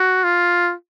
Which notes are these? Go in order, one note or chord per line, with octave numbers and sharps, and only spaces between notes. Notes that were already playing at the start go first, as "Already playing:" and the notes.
Already playing: F#4
F4